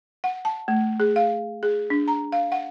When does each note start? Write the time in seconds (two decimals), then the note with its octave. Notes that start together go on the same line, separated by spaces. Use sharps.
0.24 F#5
0.45 A5
0.68 A3
1.00 G#4
1.16 F5
1.63 G#4
1.90 D4
2.08 A#5
2.32 F5
2.52 F#5